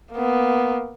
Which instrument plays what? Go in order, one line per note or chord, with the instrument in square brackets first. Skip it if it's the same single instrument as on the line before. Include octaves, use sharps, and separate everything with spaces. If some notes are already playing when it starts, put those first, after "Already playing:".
[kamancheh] A#3 B3